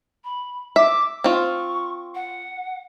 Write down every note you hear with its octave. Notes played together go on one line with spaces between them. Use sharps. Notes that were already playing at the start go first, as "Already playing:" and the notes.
B5
E5 D6
C4 F4 C#6
F#5